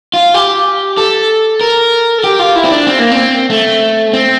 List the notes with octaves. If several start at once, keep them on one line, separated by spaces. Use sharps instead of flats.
F4
G4
A4
A#4
A4
G4
F4
E4
C4
D4
C4
A#3
C4
A3
C4